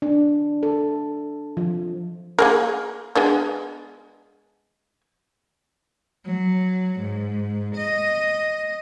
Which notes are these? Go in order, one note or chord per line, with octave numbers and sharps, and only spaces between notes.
D4
A4
F3
A#3 G#4 A#4
G#3 B3 D4
F#3
G#2
D#5